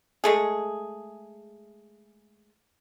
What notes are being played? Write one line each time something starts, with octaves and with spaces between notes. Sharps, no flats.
G#3 A3 G#4